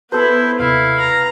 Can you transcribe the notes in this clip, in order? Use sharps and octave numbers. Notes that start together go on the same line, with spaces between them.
B3 E4 A4 B4 C5
D#2 C3 E4 F5
A#5